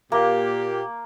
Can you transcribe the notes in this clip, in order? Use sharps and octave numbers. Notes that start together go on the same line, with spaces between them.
A#2 A#3 G4